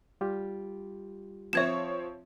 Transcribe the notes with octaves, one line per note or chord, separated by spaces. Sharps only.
G3 F4 G4
F3 C4 C#5 E5 G#6 E7